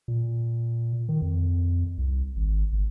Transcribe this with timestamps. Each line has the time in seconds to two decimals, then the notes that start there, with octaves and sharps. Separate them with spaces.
0.08 A#2
1.09 D#3
1.22 F2
1.98 C2
2.36 G#1
2.72 G1